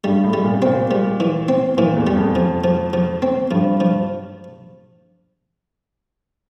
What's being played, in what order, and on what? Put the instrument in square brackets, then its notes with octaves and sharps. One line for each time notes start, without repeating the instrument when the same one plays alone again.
[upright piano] G2 [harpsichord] G3
[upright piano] A2
[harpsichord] G3
[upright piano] A#2
C3
[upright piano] A#2 [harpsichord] C4
[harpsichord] G3
E3
C4
[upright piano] A#2 [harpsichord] E3
[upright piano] E2
[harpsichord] G3
[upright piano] F2
[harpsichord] F3
F3
F3
C4
[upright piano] G2 [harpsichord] F3
[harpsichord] F3